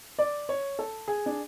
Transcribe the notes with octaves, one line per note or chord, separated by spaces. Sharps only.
D5
C#5
A4
G#4
D4